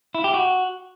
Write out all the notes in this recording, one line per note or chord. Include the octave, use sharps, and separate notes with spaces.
E4
G4
F#4